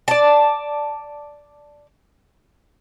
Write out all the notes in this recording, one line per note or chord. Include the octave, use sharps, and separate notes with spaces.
D5 A5